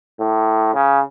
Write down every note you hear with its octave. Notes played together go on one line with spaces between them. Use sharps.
A2
C#3